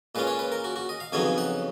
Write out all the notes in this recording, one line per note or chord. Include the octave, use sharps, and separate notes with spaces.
A#2 G#3 C#4 F4 B4
C#5
B4
A#4
F#4
F#4
D#5
F5
F2 C#3 F#3 B3 D#4 G#5
F#5